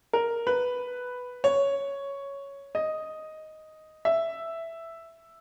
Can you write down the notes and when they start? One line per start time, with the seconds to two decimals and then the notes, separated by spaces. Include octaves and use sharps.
0.13 A#4
0.47 B4
1.44 C#5
2.75 D#5
4.05 E5